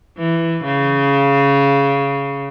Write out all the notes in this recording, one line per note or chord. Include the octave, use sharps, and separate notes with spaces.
E3
C#3